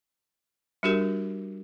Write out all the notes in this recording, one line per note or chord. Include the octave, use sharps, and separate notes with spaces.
G3 D4 F#4 G4 A#4